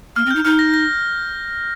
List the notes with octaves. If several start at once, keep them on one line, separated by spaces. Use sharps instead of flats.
A#3 F6
C4
D#4 G6
D#4 F6
A#6
A#6